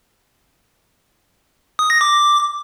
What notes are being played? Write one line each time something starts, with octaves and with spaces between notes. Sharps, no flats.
D#6
A#6
D6